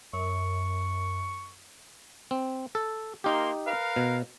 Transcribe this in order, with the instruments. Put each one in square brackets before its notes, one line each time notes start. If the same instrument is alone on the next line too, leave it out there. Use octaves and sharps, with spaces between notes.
[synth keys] F#2 [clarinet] C#6
[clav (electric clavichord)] C4
A4
[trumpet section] A#3 A#4 C6 [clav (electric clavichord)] D#4 G4
[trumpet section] A#4 B4 F5
[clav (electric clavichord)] B2